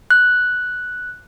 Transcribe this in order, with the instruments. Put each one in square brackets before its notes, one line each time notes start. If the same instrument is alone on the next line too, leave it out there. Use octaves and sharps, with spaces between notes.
[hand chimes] F#6